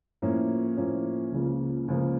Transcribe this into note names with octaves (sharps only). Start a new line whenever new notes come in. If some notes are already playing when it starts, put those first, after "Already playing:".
A2 F3 A#3 C#4
A2 F3 A#3 C#4
C#2 C#3 F3 A#3
C#2 C#3 F3 A#3